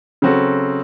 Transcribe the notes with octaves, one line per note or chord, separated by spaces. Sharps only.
C#3 F#3 C4 F#4 A4